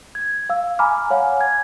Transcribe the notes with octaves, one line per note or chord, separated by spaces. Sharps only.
G#6
F5 E6
G#5 A#5 B5 D6 F6
C#5 F5 F#5 G#5
G#6